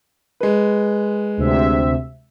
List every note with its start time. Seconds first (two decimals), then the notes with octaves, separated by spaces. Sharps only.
0.41 G#3 B4
1.37 D2 C3 E5